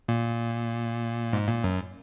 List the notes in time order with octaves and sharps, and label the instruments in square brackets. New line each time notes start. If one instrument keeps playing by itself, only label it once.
[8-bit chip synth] A#2
G#2
A#2
F#2